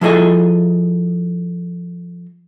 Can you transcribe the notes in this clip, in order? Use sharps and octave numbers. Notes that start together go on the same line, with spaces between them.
F3 E4 G#4 A4 D#5 G#5